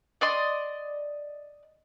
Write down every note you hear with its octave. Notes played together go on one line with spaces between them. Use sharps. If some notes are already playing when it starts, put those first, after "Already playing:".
D5 D#5 C6